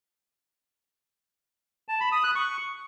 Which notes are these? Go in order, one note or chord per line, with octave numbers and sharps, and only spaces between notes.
A5
B5
D#6
F#6
C#6